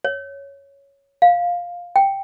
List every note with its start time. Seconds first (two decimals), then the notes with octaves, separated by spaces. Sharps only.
0.05 C#5
1.22 F5
1.96 G5